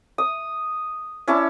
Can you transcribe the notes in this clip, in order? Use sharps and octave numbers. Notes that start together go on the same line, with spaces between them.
D#6
C#4 E4 D5 A5